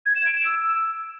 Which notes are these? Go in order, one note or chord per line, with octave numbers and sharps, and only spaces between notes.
G#6
E7
D7
E7
E6